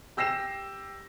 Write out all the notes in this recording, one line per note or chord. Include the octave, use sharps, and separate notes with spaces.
G4 E6 A#6 C7 E7